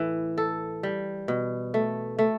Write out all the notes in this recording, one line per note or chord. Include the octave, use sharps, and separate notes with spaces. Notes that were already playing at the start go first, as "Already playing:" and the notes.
Already playing: A2 E3
A4
G3
B2
A3
A3